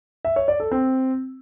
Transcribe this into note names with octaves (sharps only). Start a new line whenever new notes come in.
E5
C#5
D5
A4
C4